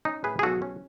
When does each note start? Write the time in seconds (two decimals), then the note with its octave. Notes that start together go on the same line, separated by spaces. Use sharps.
0.05 C#4 D#4
0.24 A2 G#4 B4
0.39 G#4
0.43 B1 F#4 A4
0.62 C#4